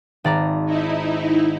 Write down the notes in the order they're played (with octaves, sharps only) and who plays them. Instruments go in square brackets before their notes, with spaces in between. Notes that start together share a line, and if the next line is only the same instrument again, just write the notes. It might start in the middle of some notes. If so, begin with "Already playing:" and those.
[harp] G#1 D5 A#5
[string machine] D#4 E4